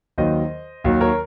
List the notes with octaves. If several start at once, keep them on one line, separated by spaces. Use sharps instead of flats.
D#2 D#3 F#3 C5 D#5
D#2 D#3 F#3
A#4 C#5